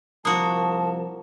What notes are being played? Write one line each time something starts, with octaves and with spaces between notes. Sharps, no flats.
C2 F3 A#3 F#4 A5 D#6